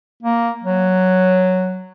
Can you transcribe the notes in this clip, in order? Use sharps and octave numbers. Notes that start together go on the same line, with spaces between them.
A#3
F#3